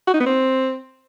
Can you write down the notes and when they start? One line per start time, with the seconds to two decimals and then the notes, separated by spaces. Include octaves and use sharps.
0.08 F#4
0.14 D#4
0.20 B3
0.26 C4